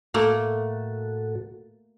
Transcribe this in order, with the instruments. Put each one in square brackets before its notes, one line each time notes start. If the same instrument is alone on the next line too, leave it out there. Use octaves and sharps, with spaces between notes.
[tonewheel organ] A2 F#4 A4 [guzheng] A3 A#3